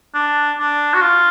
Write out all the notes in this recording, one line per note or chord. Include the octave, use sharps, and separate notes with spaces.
D4
D4
F#4
F4